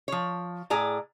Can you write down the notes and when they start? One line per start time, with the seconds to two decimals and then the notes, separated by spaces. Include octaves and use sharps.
0.08 F3 C#5
0.70 A2 G#4 D5 A#5